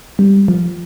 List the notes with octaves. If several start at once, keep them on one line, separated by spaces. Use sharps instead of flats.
G3
F3